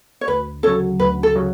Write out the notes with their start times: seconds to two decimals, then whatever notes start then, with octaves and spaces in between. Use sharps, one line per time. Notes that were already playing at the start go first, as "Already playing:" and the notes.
0.21 C#5
0.28 D2 B4
0.63 C#3 F#3 A4 C#5
0.99 D2 B4
1.23 A4
1.36 C#3 F#3